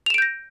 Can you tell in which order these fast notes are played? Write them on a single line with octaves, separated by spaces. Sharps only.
F7 E7 D7 G6 A#6